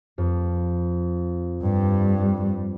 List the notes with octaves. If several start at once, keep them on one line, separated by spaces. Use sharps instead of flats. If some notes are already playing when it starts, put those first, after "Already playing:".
F2
G2 G3